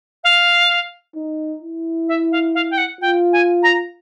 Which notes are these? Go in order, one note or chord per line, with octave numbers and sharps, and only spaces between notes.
F5
D#4
E4
E5
F5
F5
G5
F#5
F4 G5
G#5
A#5